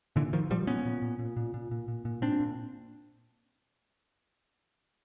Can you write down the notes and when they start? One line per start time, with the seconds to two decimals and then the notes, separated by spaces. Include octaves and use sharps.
0.16 A#2 D3 E3
0.33 A#2 D#3 F3
0.50 A#2 F3 G3
0.67 A#2 B3 C#4
0.85 A#2
1.02 A#2
1.19 A#2
1.37 A#2
1.54 A#2
1.71 A#2
1.88 A#2
2.05 A#2
2.22 A#2 C4 D4
2.40 A#2